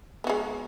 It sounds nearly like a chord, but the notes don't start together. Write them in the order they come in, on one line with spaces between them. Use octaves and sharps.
B3 F#4 G#3